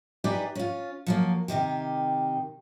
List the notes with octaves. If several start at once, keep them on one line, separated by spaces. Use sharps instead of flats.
D#4 E4 G4 G#4 B4 D5
C#4 F4
F3 F#3 A#3
C3 D#3 D#4 G4